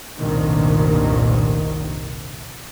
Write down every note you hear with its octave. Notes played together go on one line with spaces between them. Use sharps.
F1 C2 G2 A#2 D#3